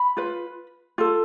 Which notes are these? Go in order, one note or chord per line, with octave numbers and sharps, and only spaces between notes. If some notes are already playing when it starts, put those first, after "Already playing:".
Already playing: B5
F4 B4
F4 A4